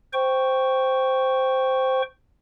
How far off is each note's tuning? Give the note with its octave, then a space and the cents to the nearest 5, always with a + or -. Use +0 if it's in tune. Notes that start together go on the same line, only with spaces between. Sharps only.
C5 -5 G5 +0 C#6 +0